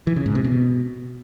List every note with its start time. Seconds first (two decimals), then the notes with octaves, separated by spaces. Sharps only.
0.07 E3
0.16 C#3
0.26 G#2
0.35 C3
0.44 B2